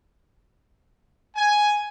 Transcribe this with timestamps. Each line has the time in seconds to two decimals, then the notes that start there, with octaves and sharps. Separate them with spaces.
1.36 G#5